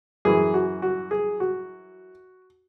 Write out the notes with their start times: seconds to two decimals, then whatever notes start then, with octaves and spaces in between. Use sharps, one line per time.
0.25 F#2 E3 G#4
0.54 F#4
0.82 F#4
1.11 G#4
1.40 F#4